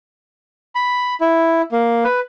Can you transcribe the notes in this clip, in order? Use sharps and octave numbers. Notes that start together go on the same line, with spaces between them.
B5
E4
A#3
B4